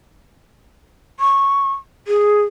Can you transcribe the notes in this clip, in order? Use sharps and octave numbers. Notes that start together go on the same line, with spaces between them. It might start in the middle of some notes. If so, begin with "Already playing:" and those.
C#6
G#4